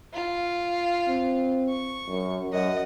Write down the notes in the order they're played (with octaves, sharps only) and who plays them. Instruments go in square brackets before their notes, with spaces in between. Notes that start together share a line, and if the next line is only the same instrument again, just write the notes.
[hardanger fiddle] F4
[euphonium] C4
[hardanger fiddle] C#6
[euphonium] F#2
[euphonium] F#2 [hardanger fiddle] D#5 F#5